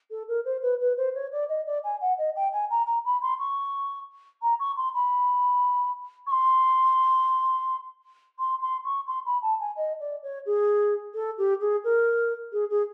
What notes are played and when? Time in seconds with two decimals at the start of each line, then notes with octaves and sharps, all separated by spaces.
0.11 A4
0.28 A#4
0.45 C5
0.62 B4
0.80 B4
0.97 C5
1.14 C#5
1.32 D5
1.49 D#5
1.66 D5
1.84 G#5
2.01 F#5
2.18 D#5
2.36 G5
2.53 G#5
2.70 A#5
2.86 A#5
3.05 B5
3.22 C6
3.39 C#6
4.42 A#5
4.60 C#6
4.77 C6
4.94 B5
6.27 C#6
6.31 C6
8.39 C6
8.61 C6
8.84 C#6
9.07 C6
9.25 B5
9.42 A5
9.59 G#5
9.76 D#5
10.00 D5
10.22 C#5
10.46 G#4
11.14 A4
11.38 G4
11.60 G#4
11.84 A#4
12.52 G#4
12.70 G#4